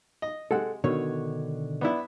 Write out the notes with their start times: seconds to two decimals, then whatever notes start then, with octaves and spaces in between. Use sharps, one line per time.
0.22 D#5
0.51 C3 G#3 A4 F#5
0.84 B2 D3 D#3 C#5
1.81 B3 D4 E4